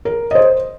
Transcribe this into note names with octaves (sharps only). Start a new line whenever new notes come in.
A#4
D#5
C5